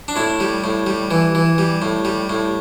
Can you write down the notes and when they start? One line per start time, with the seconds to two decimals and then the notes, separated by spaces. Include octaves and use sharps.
0.08 D4
0.16 A2 E4
0.40 G3
0.64 A2
0.87 G3
1.11 E3
1.35 E3
1.58 G3
1.82 A2
2.05 G3
2.29 A2